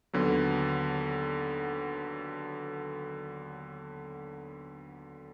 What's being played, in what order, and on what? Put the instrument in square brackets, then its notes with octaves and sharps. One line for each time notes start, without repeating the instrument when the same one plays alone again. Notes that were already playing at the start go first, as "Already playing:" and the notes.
[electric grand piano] D#2 D3 F#3 B3